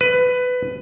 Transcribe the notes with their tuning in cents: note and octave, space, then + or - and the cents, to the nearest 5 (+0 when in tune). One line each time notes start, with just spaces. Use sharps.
B4 +15